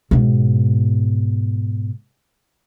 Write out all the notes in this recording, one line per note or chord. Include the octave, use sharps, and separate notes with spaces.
G#2 B2